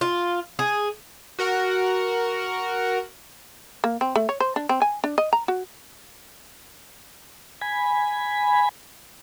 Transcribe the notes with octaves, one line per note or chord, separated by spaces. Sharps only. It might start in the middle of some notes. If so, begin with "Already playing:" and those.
F4
G#4
F#4 A#4 F#5
A#3
C4
A3
C#5
C5
D4
C4
G#5
D4
D#5
A#5
F#4
G#5 B5